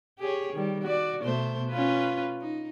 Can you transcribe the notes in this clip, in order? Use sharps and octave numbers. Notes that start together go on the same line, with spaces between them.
G4 G#4 C#5
D#3 G3
F#4 D5
B2 A3 C5
C#4 F4 B4
D#4